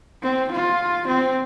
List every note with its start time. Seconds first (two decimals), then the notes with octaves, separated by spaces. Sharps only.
0.23 C4
0.52 F4
1.08 C4